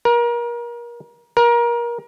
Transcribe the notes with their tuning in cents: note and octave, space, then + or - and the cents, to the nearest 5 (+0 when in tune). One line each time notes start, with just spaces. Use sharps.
A#4 +30
A#4 +25